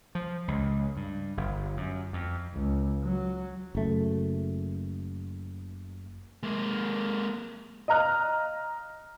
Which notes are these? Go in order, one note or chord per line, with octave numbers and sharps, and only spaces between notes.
F3
C#2
G2
G1
F#2
F2
C#2
F#3
F#1 A3
G#3 A#3
D#5 F5 A#5 F6 F#6